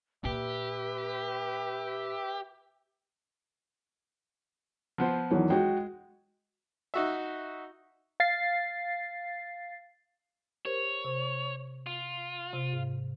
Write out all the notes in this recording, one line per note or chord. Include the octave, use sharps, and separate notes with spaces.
A#2 G4 B4 E5
F3 B3 C5
E2 D#3 E3 F#3
G#3 F#4 G5
D#4 F#4 E5
F5 A6 C7
G4 A#4 C5 C#5
C3 C5
F4
C3 F6
G#2